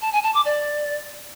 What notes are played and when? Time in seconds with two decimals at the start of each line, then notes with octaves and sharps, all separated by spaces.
0.02 A5
0.13 G#5
0.24 A5
0.34 D6
0.45 D5